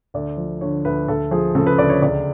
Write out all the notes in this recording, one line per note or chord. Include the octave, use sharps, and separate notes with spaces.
D2 D5
F3
D3 C#5
D2 B4
D2 A4
F3 G#4
C#3 A4
B4
D2 D5
C#5
C#2 D5